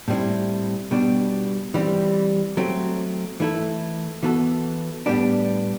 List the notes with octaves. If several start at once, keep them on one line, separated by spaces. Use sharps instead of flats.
A2 G3 C4 E4
B2 G3 D4
E3 G3 C4
F#3 A3 C4
E3 A3 E4 A4
E3 B3 F#4 A4
A2 G3 B3 D4 G4